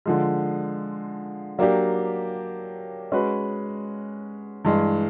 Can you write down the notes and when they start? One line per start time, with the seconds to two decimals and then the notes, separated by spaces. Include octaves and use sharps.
0.06 D3 F3 G#3
1.59 F#3 A#3 D4 G4
3.12 G#3 C#4 F#4 B4
4.65 G2 E3 G#3